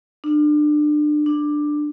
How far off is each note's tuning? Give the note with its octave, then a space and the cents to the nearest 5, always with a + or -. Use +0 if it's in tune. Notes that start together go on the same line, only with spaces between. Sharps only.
D4 +30
D4 +10